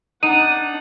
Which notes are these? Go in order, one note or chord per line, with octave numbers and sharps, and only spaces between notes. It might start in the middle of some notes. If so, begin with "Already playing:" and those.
D4 D#4 F#5 D#7